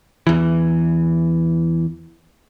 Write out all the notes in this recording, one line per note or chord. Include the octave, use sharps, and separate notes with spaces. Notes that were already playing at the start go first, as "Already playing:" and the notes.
E2 E3